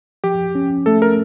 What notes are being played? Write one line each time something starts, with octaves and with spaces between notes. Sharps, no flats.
F3 G4
C#4
A3 A4
A#4